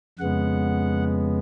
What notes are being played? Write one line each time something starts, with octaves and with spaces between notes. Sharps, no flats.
F2 C#3 G#3 B3 F#5